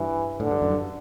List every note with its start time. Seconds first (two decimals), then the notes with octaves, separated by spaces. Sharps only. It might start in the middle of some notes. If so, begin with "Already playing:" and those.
Already playing: G2 E3
0.40 A2 D3
0.51 G2
0.62 F#2
0.71 G2